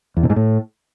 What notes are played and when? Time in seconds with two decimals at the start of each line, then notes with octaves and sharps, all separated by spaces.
0.17 E2
0.23 B2
0.30 G#2
0.36 A2